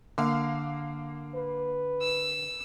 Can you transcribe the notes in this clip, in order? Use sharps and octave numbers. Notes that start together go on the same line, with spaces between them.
D3 A#3 F5
B4
E6